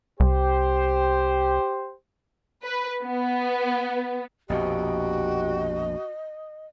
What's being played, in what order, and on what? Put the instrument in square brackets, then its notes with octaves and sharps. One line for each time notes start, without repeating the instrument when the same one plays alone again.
[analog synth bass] C2 [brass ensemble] G4 C5
[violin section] B4
B3
[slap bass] A#1 F2 B2 [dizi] F#4 [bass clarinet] G4 [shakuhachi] D#5